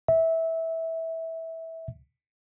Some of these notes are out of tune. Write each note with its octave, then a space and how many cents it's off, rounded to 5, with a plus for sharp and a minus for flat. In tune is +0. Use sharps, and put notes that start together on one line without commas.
E5 -15